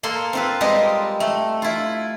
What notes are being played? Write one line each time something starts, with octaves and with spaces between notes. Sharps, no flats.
A#3 A4 C6
C4 F4 B4
G3 G#3 C4 G4 A#4 D#5
A3
E4 F4